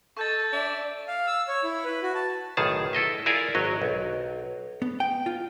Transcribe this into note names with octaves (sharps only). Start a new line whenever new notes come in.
A4 D#5 C#6 G6 A6
D5 E5
F5
E6
C#5
E4
B4
F#4
A5
B1 A2 D#3 G#4 A5
E4 A4 D#5 E5
E4 F4 G#4 A#4 D5 G#5
G#1 F#3 C#5 D#5
B1
B3
G5
F4